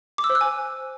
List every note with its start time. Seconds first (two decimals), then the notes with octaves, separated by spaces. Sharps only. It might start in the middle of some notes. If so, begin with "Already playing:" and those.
0.18 D6
0.24 E6
0.30 C5
0.35 F#6
0.41 G#5